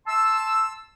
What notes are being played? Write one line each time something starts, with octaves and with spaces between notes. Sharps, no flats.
A5 C6 E6